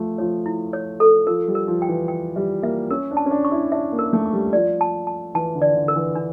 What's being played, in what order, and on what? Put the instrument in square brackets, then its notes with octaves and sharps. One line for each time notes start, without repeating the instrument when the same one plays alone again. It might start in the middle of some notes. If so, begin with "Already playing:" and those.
Already playing: [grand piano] F3 A3
[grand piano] F3 [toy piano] C#5
[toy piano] E4
C#5
A4
[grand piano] F3 [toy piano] A#4
[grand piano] G3
[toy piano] A#4
[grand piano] F3
[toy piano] G5
[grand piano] E3
[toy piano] G5
[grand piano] G3 [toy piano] E5
[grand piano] A#3 [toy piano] E5
[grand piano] C#4 [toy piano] A#4
[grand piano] D4
[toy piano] A5
[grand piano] C#4
D4
[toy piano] C#6
[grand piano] E4
[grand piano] D4 [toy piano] E5
[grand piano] A#3
[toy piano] A#4
[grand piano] A3
[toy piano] C#6
[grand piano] G3
[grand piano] F3 [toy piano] D5
[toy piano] A5
A5
[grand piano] E3 [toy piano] A5
[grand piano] D3
[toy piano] D5
[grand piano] D3
[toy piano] A#4
[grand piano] E3
[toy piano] D4